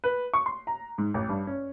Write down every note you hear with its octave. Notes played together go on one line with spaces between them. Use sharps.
B4
C#6
C6
A#5
G#2
A1
G2
C#4